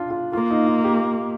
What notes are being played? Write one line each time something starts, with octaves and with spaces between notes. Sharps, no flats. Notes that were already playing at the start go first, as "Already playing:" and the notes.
Already playing: D4 F4
F4
A#3 F4
D#4
F4
G4